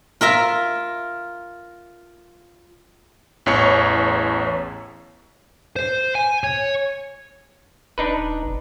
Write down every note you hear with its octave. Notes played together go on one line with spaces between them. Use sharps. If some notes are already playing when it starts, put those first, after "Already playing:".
F4 A#4 E5 A#5
A1 E2 C#5 C#7
C5
G#5
C#5
D#1 D4 D#4 B4
G1